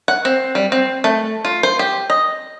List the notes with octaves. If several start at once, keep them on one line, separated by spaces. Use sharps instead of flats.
F#5
C4
G3
C4
A3
F4
C5
G4
D#5